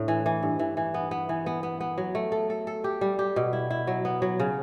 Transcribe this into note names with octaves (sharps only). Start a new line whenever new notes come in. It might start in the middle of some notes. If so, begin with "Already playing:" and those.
Already playing: A2 D4
E3
E3
G2
E3
E3
B3
B3
E3
B3
B3
B3
F#3
A3
A4
A4
A4
G4
G3
G4
B2
E4
E4
F#3
B3
F#3
C#3